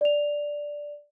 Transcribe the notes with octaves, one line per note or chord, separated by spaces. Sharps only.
D5 F7